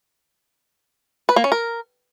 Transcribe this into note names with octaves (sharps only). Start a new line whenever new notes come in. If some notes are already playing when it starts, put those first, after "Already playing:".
B4
A#3
C#4
A#4